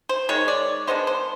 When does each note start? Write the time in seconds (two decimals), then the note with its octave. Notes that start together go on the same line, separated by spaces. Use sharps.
0.09 C5
0.29 D#3 G#3 C#5
0.48 D5
0.87 D#3 G#3 B3 D4 C5
1.07 C5